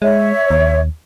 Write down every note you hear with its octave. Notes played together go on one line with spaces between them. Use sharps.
G#3 C#5 E5
D#2